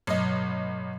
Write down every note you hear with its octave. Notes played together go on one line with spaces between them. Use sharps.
A1 G2 B2 F#3 D#5